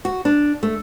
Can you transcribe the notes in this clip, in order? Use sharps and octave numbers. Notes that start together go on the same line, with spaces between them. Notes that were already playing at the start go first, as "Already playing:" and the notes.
F#4
D4
A3